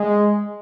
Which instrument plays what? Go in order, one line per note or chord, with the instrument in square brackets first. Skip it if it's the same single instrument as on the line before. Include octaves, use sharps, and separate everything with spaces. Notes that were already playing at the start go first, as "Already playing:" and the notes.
Already playing: [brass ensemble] G#3